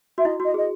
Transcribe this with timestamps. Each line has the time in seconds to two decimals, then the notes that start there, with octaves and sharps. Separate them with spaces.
0.18 F#4 E5
0.25 E4 D#5
0.40 F#4 D#5
0.54 G#4 D#5